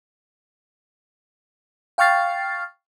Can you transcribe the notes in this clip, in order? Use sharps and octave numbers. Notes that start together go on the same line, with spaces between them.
F5 G5 C#6 F6 A6 C7